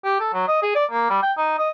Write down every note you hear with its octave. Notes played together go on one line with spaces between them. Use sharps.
G4
A4
F#3
D#5
G#4
D5
A#3
G3
G5
D#4
D#5